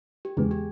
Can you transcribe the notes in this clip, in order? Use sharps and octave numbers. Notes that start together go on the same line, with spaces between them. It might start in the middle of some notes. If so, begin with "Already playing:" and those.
G4
E2 C#3 E3 G#3 B3 G#4
G4